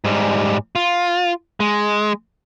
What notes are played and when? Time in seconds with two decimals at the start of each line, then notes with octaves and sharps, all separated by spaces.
0.05 G#2 G3
0.76 F4
1.60 G#3